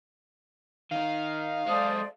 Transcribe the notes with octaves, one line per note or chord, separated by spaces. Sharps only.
D#3 D#4 F5
G#3 A4 C5 D5 D#6